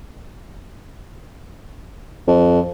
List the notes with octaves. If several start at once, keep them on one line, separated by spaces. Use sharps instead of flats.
F2